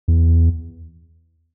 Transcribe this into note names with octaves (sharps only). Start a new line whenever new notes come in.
E2